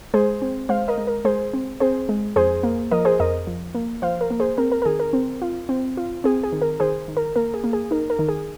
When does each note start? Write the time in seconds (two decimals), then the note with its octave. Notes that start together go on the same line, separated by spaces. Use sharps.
0.14 G#3 G#4 C5
0.42 C4
0.69 G#3 C5 F5
0.88 A#4 D#5
0.98 G#3
1.07 A#4
1.25 G#3 G#4 C5
1.54 C4
1.80 C4 G#4 C5
2.09 G#3
2.36 F2 G#4 C5
2.63 A#3
2.91 F3 A#4 D#5
3.05 G#4 C5
3.19 F2 A#4 D#5
3.47 F3
3.75 A#3
4.02 F3 C5 F5
4.21 A#4
4.30 A#3
4.40 G#4 C5
4.58 C4 A#4
4.72 A#4
4.82 A#4
4.85 D#3 G#4
5.00 A#4
5.13 C4
5.42 F4
5.69 C4
5.97 F4
6.24 C4 G#4
6.43 G#4
6.52 D#3
6.62 A#4
6.80 D#3 G#4 C5
7.08 D#3
7.17 A#4
7.36 A#3 A#4
7.54 G#4
7.64 A#3
7.73 G#4
7.91 D#4 A#4
8.10 A#4
8.19 D#3
8.29 G#4